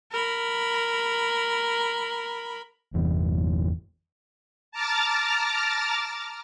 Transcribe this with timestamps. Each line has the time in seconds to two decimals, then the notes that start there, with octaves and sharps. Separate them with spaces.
0.12 A#4 B5
2.93 G1 E2 E3
4.72 A5 A#5 D6 F6 A6